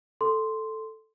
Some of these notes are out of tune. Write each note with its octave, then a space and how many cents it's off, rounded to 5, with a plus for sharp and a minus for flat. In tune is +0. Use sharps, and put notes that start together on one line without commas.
A4 +0 C6 -5